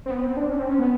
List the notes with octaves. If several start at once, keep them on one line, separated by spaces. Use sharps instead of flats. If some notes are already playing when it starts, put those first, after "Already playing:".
C4
B3
C4
D4
C#4
C4
C#4
B3